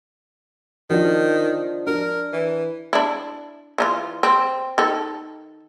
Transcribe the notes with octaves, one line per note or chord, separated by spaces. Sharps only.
D#3 F3 D4
D4 A#4
E3
D4 E4
E3 D#4 F4
C4
D#3 A4